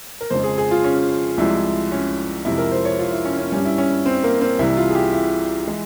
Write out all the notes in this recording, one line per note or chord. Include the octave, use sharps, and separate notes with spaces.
A#4
F2 C#3 F3 G#3 C5
G#4
G#4
F4
C#4
C2 C3 F3 G#3 E4
C#4
F2 C3 F3 G#3 E4
A#4
C5
C#5
F4
E4
C#4
C#4
G2 G3 C#4
E4
C#4
C4
A#3
C4
C2 C3 E3 G3 E4
F4
G#4
G4
E4
E3 G#3